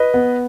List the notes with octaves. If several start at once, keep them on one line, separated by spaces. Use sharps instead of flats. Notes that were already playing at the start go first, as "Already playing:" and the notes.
Already playing: B4 D#5
B3